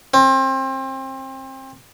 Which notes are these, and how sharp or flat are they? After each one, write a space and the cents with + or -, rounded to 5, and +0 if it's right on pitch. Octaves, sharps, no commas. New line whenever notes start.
C4 +30